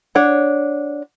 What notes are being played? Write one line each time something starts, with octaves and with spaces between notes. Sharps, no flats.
D4 C#5 F#5